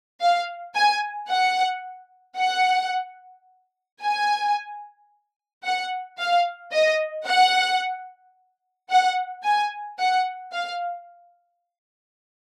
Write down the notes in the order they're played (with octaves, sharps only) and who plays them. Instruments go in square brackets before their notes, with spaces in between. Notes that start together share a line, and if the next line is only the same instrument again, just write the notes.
[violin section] F5
G#5
F#5
F#5
G#5
F#5
F5
D#5
F#5
F#5
G#5
F#5
F5